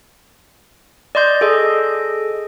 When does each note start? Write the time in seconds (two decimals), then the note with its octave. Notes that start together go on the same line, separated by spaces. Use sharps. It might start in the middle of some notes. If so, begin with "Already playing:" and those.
1.15 D5 D#5 C6 G6
1.41 G#4 A4 D#5